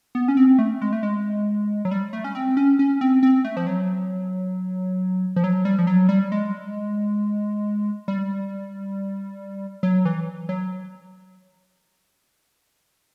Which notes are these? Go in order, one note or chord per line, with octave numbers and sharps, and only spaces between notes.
B3
C#4
C4
A3
G#3
A3
G#3
F#3
G3
A3
C#4
C4
C#4
C#4
C4
C4
A3
F3
F#3
F3
F#3
G3
F3
F#3
G3
G#3
G3
F#3
E3
F#3